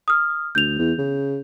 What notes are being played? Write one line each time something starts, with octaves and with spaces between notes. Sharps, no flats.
D#6 F6
D2 G6 F7
E2
C#3